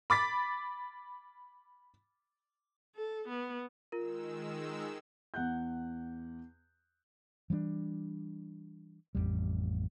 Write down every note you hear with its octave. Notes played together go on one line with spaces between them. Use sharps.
B5 D6 A6 B6
A4
B3
D#3 G#3 F4 A#4 E6
E2 F#5 F#6 G6
E3 G3 A#3 D4
A1 F2 G#2 G3